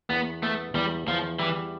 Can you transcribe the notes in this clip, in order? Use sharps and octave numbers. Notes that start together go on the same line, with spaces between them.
E2 B3
A3 B3
E2 G3
E2 F3
E3 G3